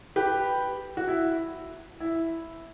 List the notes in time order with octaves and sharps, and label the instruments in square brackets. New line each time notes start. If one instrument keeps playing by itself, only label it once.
[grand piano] G4 B4
F#4
E4
E4